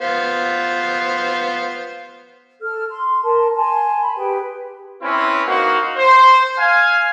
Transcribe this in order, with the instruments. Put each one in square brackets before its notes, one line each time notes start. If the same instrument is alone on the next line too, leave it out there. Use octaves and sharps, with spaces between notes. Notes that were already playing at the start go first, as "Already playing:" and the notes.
[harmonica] B3 F4 C5
[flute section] A4 F6
C6
A#4 A5 C6
G#5 A5 C6
B5
G4 G#4 B4 G5
[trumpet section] C4 C#4 E4 B4
A#3 D#4 F#4 C5 F5
C5
F5 G#5